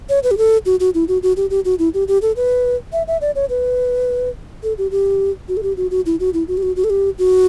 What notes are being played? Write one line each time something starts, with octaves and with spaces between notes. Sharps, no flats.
C#5
B4
G4
A4
F#4
F#4
E4
F#4
F#4
G4
G4
F#4
E4
G4
G4
A4
B4
E5
E5
D5
C#5
B4
A4
G4
G4
F#4
A4
G4
F#4
F#4
E4
F#4
E4
F#4
G4
F#4
F#4
A4
G4
F#4